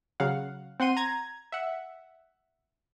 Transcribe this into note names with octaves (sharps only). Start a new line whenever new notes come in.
C#3 F#3 F5 F#5
C4 F#5 C6 D#7
A#5 G#6
E5 F#5